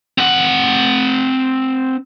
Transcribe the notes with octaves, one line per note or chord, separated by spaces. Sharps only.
C4 F#5